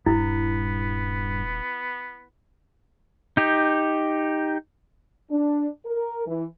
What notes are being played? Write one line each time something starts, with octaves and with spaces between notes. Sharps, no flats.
D#1 G2 B3 E4
D#4 G4
D4
A#4
E3